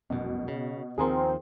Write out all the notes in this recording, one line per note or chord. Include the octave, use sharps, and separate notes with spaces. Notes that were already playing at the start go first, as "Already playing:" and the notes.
F1 C2 F#2 B2
C#3
D#2 D#3 F3 C4 G#4 A#4 C6